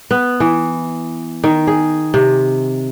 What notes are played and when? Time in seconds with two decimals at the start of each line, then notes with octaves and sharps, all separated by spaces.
0.11 B3
0.40 E3
1.44 D#3
1.67 G#4
2.14 C3